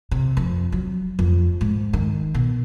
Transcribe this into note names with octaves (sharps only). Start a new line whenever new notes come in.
C3
F2
F#3
F2
G#2
D#3
B2